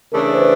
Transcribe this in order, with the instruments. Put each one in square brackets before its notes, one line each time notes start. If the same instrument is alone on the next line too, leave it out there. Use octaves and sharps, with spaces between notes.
[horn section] C#3 E3 A3 D4 [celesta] A#4
[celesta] C5
B4